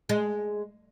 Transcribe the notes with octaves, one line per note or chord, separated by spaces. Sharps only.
G#3